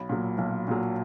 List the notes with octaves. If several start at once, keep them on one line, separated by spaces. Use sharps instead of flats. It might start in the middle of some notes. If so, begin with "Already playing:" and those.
Already playing: B1 B5
A#2 F#3
B1
A#2 F#3